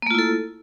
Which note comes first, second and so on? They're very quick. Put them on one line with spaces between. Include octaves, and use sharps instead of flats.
A#3 A3 F4 E4 A4